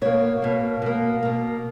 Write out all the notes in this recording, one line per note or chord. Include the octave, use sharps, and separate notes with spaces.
B2 A#3 C#5
B2 A#3
B2 A#3
B2 A#3